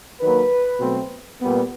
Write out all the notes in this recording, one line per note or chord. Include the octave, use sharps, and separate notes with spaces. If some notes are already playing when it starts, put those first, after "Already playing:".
D#3 F#3 A#3 B4
B2 F#3 A3 C4
A#2 G3 B3